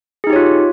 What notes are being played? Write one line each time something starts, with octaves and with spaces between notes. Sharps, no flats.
D#4 F4 G4 G#4 C#5